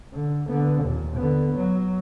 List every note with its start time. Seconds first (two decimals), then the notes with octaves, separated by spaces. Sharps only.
0.13 D3
0.48 D3 B3
0.84 D#2 A#2
1.17 D3 B3
1.56 F#3